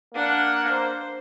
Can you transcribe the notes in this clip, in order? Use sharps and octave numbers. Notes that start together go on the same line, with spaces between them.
A#3 D4 F#5
C5